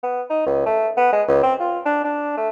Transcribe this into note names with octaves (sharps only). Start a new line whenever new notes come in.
B3
D#4
C#2
A3
B3
G#3
C#2
C4
F4
D4
D4
A3